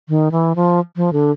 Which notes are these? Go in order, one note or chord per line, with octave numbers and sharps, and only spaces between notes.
D#3
E3
F3
F3
D3